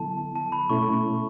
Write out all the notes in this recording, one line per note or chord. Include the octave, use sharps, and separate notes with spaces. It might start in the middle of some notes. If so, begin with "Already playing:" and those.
Already playing: D3 F#3 B3 E4 A4 A5
A5
B5
B2 A3 C#4 E4 A4 C#6